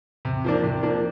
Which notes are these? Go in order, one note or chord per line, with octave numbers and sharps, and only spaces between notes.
C3
F3 A#3 D4
C3
F3 A#3 D4